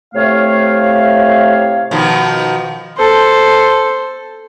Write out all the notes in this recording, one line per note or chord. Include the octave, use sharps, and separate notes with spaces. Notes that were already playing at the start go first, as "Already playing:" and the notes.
A2 C3 A3 C#5 F5
B2 D#3 F3
A4 C5